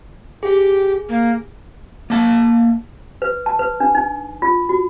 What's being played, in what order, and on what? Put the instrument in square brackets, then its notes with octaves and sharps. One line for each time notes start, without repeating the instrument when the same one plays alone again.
[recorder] G4 [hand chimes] G#4
[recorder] A#3
[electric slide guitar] A#3 A5
[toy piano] B4
A5
B4
D4
D#4
F4
F#4